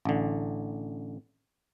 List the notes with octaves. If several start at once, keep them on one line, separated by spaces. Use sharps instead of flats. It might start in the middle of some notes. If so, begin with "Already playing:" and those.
A1 D3